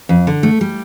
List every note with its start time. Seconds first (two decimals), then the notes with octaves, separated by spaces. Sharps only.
0.09 F2
0.27 D3
0.43 A3
0.61 G3